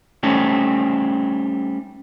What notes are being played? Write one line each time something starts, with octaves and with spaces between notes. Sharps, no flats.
G3 A3 C4 C#4 D#4